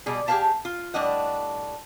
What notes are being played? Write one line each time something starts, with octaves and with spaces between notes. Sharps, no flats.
B2 G3 G#4
G4 G#4 B4 C5 F5 A5
F4
A2 G3 D4 D#5 F#5